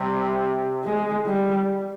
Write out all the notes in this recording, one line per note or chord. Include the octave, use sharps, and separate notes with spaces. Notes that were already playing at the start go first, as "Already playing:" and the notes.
Already playing: C3 G3
G#3
G3